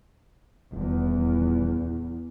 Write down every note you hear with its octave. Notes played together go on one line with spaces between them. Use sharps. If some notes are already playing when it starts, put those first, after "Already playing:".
D#1 E2